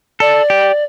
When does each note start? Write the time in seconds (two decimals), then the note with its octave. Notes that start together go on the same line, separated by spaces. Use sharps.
0.20 A4 D5
0.50 G4